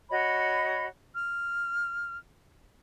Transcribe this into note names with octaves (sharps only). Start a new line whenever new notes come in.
F#4 C#5 D#5 B5
F6